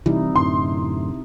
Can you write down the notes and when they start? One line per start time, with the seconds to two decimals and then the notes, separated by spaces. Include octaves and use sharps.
0.06 C3 E3 G3 D#4 E4
0.36 F#2 A2 D3 C6